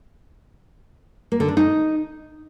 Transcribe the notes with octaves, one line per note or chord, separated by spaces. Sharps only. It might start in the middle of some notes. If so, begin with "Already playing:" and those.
A#3
D3
D4
D#4